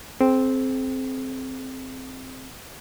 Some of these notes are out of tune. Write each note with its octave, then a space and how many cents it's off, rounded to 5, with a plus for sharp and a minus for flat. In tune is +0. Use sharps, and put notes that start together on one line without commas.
C4 +0 G#4 +45